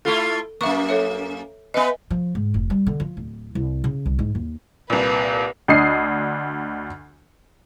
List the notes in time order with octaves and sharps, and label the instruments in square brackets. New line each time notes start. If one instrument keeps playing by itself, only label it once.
[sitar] A3 E4 F4 [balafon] A4
[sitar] F#2 A#3 [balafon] E5 C#6
[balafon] A4 C#5 E5
[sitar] B3 B4 [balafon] D#5 E5 G#5
[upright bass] F3
G#2
F1
G3
D3
F3
D1
C2
C#3
C2
G#2
D#2
[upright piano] C2 A#2 [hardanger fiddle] B4
[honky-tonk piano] D2 D4 D#5 D#6 C7